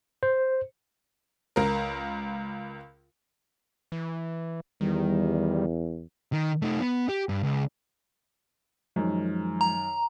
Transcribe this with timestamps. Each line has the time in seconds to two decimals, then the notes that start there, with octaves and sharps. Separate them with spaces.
0.23 C5
1.56 C#2 A#4
3.92 E3
4.81 E2 D#3 G3
6.33 D#3
6.62 A3 D#4
6.81 B3
7.09 G4
7.29 G2
7.44 C#2
8.96 F#2 D#3 F3 G#3
9.61 A#5